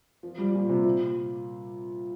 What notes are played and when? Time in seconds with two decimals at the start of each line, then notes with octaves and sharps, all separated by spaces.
0.23 F3
0.38 G3
0.54 A#2
0.69 C3
0.85 A#2